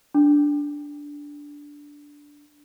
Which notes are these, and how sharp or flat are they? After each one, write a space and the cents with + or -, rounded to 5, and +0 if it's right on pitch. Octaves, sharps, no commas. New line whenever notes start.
D4 -10